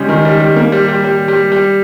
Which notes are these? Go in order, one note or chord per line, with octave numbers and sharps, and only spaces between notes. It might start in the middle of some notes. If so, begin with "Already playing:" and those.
Already playing: C#3 G3 G#3
D#3
G3
G3
A#3
G3
G3
G3
G3
G3